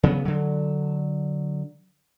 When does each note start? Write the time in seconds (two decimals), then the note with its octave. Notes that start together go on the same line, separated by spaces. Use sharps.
0.03 C#3 F#3 B3
0.25 D3 F#3